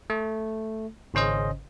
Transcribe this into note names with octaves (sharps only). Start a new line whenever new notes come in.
A3
G#1 C#3 C#4 C5 D#5